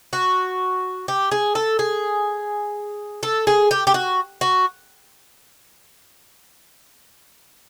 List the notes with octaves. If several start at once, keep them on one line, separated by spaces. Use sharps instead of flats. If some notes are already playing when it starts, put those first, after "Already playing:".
F#4
G4
G#4
A4
G#4
A4
G#4
G4
G4
F#4
F#4